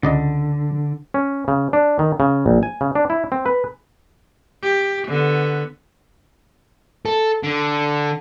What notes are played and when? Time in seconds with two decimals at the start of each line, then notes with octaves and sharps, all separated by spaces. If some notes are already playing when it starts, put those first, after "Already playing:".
0.03 C#2 D3 D5 D#5
1.14 C#4
1.48 C#3
1.73 D4
1.99 D#3
2.20 C#3
2.46 A#1
2.63 G#5
2.81 C#3
2.95 D4
3.10 E4
3.32 C4
3.46 B4
4.62 G4
5.07 D3 B3
7.06 A4
7.43 D3